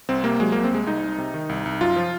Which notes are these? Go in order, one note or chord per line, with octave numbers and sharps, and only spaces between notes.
C2 C4
C3 A#3
F#3 G#3
C2 A#3
C4
C2 G#3
C2 D#4
C2
C3
D#3
C2
C2
F#2 F4
F3